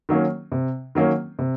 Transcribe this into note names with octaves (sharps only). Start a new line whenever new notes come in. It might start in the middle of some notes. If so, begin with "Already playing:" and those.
D#3 F#3 A#3 C#4
C3
D#3 F#3 A#3 C#4
C3